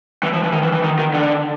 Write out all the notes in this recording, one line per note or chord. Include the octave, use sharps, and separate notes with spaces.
E3
F3
E3
D#3
E3
E3
D#3
D#3
D3